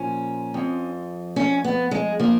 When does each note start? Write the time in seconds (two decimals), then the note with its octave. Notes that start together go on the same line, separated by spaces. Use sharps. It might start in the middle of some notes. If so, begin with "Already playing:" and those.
Already playing: A#2 F3 C#4
0.54 F2 F3
1.36 C#4
1.64 B3
1.91 G#3
2.20 F3 A#3